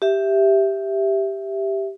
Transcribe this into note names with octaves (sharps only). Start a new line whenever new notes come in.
G4 E5